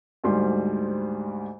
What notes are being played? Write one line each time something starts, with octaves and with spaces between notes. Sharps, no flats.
D2 G#2 G3 C6